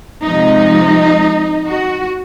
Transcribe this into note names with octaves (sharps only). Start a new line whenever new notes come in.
C3 F3 G#3 D#4
F#4